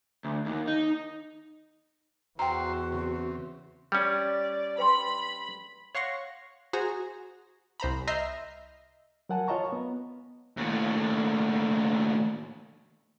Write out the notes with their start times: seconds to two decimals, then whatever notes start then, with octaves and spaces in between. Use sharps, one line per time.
0.25 D2
0.46 D#2
0.68 D#4
2.39 E2 F#4 C5 E5 G5 A#5 C6
2.92 C#3 C4
3.92 G3 C#4 D5 G5
4.78 B4 G5 B5 C6
5.95 C#5 F5 F#5 C6 C#6 A#6
6.73 F#4 G#4 C5 G#5 A#5
7.80 C2 C5 A#5 B5
8.07 D#5 E5 A#5 C6 F6 G6
9.29 F#3 A#4 F#5 G#5 A5
9.48 F4 C#5 D#5 A5 A#5 C#6
9.72 B3
10.57 D#2 A2